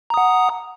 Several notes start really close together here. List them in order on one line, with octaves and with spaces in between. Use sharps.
A#5 D#6 F#5